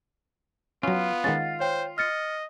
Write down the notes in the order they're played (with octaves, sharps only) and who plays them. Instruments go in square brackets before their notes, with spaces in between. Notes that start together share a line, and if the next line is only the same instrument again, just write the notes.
[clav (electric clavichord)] F#3 C#4 [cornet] B3 [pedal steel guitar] F4
[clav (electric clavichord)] D#3 G#3 C#4 [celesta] F#5 A6
[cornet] C5 [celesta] C#5 G5
[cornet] D#5 [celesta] F6 A6 C#7